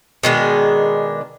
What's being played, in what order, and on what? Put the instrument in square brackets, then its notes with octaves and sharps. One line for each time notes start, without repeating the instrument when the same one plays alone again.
[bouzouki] B2 D#3 G#3 D4